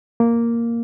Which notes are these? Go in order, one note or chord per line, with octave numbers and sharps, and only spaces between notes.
A#3